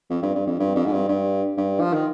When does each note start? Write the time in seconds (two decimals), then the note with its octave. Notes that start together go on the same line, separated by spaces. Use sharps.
0.10 F2
0.22 G2
0.35 G2
0.46 F2
0.59 G2
0.75 F2
0.86 G#2
0.92 G2
1.08 G2
1.57 G2
1.80 F3
1.93 D#3